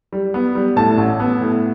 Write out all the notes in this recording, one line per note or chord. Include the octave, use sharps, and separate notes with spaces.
G3
B3
G3
A2 A5
A1
B3
A2